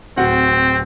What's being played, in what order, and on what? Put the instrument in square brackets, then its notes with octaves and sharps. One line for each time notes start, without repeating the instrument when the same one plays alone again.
[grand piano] D1 F#4 F#5 [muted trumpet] C4